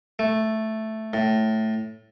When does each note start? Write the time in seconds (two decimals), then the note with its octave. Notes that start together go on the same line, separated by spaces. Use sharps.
0.19 A3
1.13 A2